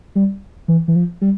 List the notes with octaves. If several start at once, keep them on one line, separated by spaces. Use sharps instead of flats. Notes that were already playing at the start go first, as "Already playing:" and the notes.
G3
E3
E3
F3
G3